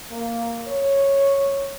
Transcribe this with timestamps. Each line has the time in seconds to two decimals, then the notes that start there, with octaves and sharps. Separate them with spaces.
0.11 A#3
0.68 C#5